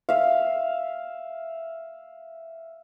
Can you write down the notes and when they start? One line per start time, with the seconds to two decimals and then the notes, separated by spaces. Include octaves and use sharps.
0.09 E5 F5